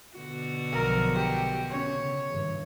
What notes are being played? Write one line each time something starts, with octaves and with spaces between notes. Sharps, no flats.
B2 D3 F#4
B1 F3 A#4
G4
C#4 C#5
C#3
G2 E3